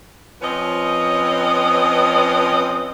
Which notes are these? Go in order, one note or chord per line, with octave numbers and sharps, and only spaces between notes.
F3 C4 C#4 B4 D#5